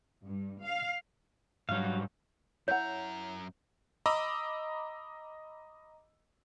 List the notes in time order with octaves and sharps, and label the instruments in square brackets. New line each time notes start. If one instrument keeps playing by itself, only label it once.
[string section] G2
F5
[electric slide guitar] G#2 G3 [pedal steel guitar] F#3 F5
[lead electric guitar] F#2 A#5 [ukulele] E4 F#5 [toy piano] C#5
[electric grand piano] D#5 A#5 B5 D6 E6